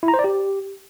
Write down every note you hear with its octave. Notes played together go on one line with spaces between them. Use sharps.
E4
A#5
C5
D5
G4